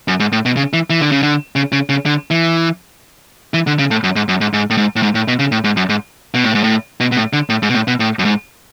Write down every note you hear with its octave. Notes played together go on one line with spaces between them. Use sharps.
F#2
G#2
A2
B2
C#3
E3
E3
D3
C#3
D3
C#3
C#3
C#3
D3
E3
E3
D3
C#3
A2
F#2
G#2
F#2
G#2
G#2
A2
G#2
A2
G#2
A2
B2
C#3
A2
G#2
F#2
G#2
B2
A2
G#2
A2
B2
B2
A2
D3
A2
G#2
B2
A2
B2
A2
F#2
G#2